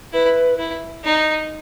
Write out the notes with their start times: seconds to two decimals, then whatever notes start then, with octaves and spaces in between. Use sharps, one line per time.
0.13 E4 B4
0.59 E4
1.04 D#4